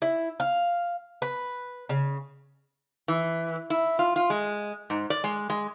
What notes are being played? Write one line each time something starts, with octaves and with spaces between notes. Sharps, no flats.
E4
F5
B4
C#3
E3
E4
F4
F4
G#3
G#2
D5
G#3
G#3